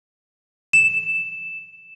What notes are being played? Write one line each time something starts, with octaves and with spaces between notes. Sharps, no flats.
E7